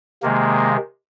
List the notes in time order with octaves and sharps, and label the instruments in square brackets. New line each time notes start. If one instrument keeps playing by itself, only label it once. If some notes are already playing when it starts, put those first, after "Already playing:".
[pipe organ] C3 D#3 G#3 A#3